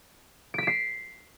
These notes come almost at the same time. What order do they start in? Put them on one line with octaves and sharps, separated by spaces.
D7 B6 E7 C7